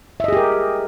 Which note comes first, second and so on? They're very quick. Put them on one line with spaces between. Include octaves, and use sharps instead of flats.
E5 D#5 G#4 G4 A#4